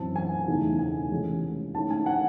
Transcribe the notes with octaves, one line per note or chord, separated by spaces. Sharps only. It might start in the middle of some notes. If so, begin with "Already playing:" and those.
Already playing: F#2 E3 C4 A5
G#5
E2 C#3 E3 A3 D#4
G#5
C3 E3 G#3 C#4
D#3 A3 C#4 E4 A5
G#5
F#5